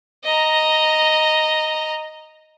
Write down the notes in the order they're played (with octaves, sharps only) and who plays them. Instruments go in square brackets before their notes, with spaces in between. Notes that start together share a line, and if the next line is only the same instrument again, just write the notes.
[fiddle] D#5 A#5